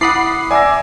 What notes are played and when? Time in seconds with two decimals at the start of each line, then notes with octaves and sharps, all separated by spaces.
0.01 E4 F#5 B5 D6 D#6 A6 C7
0.51 D5 E5 G#5 D6 E6 A#6